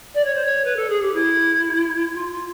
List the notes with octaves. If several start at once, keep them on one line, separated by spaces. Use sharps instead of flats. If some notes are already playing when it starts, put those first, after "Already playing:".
D5
C#5
C5
C#5
B4
A4
G#4
G4
E4
F4
F4